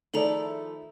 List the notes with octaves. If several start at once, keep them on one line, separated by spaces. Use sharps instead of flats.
D#3 F3 A3 E4 G#4 A4 D5 A#5